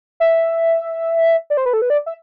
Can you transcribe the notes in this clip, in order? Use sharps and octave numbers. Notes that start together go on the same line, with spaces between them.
E5
D5
C5
B4
A4
B4
D5
E5